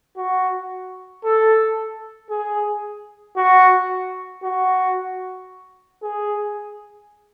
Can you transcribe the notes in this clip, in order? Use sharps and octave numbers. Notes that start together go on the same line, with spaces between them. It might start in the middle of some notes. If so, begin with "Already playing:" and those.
F#4
A4
G#4
F#4
F#4
G#4